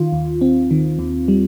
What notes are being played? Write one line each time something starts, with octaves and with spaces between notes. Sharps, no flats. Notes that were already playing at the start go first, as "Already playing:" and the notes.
Already playing: D#3 F4
D#2
C4
D#3
D#2
G3